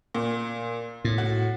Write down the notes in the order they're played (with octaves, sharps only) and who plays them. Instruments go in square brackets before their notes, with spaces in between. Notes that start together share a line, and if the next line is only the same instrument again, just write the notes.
[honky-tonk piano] A#2
[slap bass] A2
[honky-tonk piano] F#4